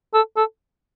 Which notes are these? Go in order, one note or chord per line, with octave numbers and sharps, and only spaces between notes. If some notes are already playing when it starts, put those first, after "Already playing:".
A4
A4